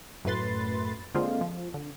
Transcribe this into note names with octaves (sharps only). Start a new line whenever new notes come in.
F#2 A2 A3 B4 C6 A6
D3 G#3 A#3 C4 F4
F3
D3